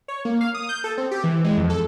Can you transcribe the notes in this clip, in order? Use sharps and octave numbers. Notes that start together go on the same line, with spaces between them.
C#5
A#3
F5
D#6
G6
A4
C4
G4
E3
G#3
F2
A4